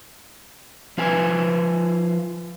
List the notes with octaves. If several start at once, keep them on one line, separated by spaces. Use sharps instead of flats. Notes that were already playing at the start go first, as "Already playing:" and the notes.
F3 F4 B4 G#5